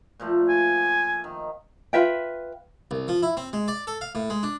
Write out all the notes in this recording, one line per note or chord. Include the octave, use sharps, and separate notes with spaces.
A#2 F3 A3
G#5
D#3
F4 B4 E5 G5
C2
F3
E4
C4
G#3
D5
A4
F5
A2
G#3
D4